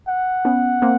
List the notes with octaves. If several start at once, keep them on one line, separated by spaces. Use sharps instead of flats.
F#5
B3 C#4
A#3 C4